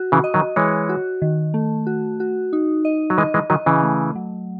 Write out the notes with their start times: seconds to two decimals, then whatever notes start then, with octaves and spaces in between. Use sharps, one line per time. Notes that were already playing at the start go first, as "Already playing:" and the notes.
Already playing: F#4
0.12 C#3 E3
0.24 D#5
0.34 D#3 F#3
0.56 E3 G#3 C#5
0.89 F#4
1.22 D#3
1.54 A3
1.87 F#4
2.20 F#4
2.53 D#4
2.85 D#5
3.10 F#3
3.18 E3 G#3 D#5
3.34 E3 G#3
3.50 D#3 F#3 D#5
3.66 C#3 E3
3.83 A3
4.15 F#3